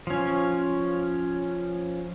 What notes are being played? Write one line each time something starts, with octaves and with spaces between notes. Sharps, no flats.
F3 C#4